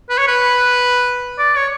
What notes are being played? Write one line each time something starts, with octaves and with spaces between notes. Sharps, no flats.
B4
C#5
B4
D5
C#5